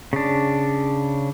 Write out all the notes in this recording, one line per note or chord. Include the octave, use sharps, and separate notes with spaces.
C#3 D4